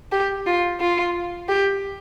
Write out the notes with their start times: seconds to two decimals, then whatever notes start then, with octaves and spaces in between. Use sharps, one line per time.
0.12 G4
0.46 F4
0.80 F4
1.48 G4